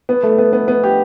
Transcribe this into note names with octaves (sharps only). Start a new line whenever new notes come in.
B3
A3
B3
B3
B3
G4